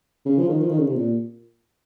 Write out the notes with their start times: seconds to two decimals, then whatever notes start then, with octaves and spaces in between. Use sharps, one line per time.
0.25 C#3
0.38 F3
0.49 D#3
0.61 F3
0.69 D#3
0.79 C#3
0.87 C3
0.96 A#2